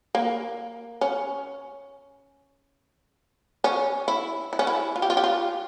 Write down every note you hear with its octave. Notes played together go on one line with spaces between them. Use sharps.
A#3
C#4
C#4
E4
E4
C#4
E4
F4
G4
F4
G4
F4